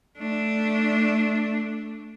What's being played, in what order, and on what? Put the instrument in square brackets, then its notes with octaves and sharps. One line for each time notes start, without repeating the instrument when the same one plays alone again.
[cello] A3 D4